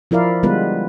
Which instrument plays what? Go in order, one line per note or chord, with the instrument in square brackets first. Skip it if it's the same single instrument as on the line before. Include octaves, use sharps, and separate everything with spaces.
[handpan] F3 E4 A#4 D5 F5
D3 G3 G#3 B3 F4 B4